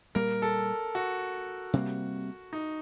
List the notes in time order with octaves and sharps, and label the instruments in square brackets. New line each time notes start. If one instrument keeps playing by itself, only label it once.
[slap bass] A#2 G3 A#3 [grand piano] A#4
[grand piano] A4
F#4
[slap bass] C3 G3 A#3
[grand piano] D#4